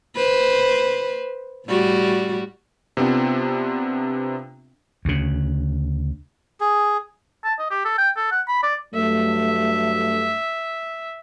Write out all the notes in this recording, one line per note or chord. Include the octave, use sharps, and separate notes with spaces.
B4 C5
A2 G3 F#4
C3 B3 C4 D4 F4
D2 C#3
G#4
A5
D#5
G4
A4
G5
A4
F#5
B5
D5
G2 F#3 A3 E5